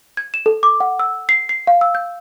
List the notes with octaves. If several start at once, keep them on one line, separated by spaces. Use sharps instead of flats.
G#6
E7
A4
D6
F#5
E6
C7
C7
F5
E6
G6